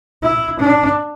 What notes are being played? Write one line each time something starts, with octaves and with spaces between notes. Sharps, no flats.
E4
D4